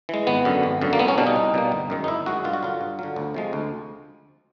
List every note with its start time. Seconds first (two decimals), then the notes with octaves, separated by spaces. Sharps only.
0.09 E3 G#3
0.27 G#1 B3
0.45 F#2 D3
0.63 G#1
0.81 F#2 D3
0.93 A#3
0.99 C2 B3
1.08 C#4
1.18 B2 G3 A#3 D4
1.27 D#4
1.36 C2
1.54 B2 G3 A#3
1.72 G1
1.90 F#2 D#3 G#3
2.04 D#4
2.08 G1 E4
2.26 F#2 D#3 G#3 F#4
2.44 G2 F4
2.53 F#4
2.63 D3 F#3 F4
2.81 G2
2.99 D3 F#3
3.16 D2
3.34 C3 F3 G#3
3.53 D2